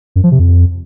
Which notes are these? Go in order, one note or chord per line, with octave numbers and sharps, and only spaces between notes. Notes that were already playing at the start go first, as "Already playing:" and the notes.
F#2
F3
C3
F2